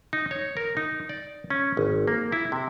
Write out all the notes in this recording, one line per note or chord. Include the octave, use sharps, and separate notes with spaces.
D#4
C#5
A#4
D#4
D5
C#4
G#1
A#3
E4
C3